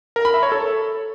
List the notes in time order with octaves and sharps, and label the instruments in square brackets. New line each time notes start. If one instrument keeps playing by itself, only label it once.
[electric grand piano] A#4
B5
E5
C#5
A4